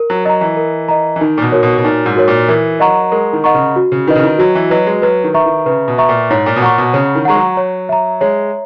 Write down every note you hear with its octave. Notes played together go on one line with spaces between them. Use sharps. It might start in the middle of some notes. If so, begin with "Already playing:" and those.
Already playing: A#4
F#3
F#3 D#5 A#5
E3
A#4
D#5 A#5
E3
D#3 D#4
A#2
B2
F#4 A#4 C#5
B2
B2
A#2 D#4
G#2
F#4 A#4 C#5
A#2
E3 A#4
F#3 D#5 F#5 A#5 C#6
G#3 A#4
D#3
D#5 F#5 A#5 C#6
C#3
F#4
C#3
D#3 B4 D#5
C#3
D#3
F#3 F#4
E3
F#3 B4 D#5
G#3
F#3 B4
D#3
E5 A#5 C#6
D#3
C#3 B4
B2
E5 A#5 C#6
A#2
G#2 C#5
A#2
B2
A#2 F#5 A#5 C#6
B2
C#3 C#5
D#3
G#3 F#5 A#5 C#6
F#3
C#5
E5 A#5
G#3 C#5